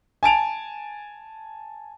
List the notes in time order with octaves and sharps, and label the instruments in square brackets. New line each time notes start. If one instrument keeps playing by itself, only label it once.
[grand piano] G#5 A5 D7 F7